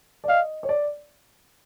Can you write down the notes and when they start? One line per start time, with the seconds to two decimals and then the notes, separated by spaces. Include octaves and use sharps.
0.24 D5
0.28 D#5 F5
0.63 C#5
0.69 D5